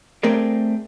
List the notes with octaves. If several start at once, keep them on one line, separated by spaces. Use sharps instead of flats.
A3 C4 G#4 A#4 D5